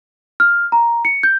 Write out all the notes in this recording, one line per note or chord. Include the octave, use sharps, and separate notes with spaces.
F6
A#5
C#7
G6